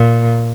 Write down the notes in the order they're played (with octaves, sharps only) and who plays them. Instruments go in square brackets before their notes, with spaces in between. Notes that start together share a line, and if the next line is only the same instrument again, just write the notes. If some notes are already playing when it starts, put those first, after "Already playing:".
Already playing: [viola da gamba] A#2